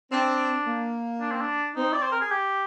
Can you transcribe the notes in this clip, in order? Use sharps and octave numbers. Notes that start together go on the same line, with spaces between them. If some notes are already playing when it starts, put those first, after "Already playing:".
C4 D4
A#3
D4
C4
D4
C4 D#4
D5
C5
A#4
G#4
G4